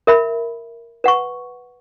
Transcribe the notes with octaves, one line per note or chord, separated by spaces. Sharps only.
A#4 E5 B5
B4 F#5 C#6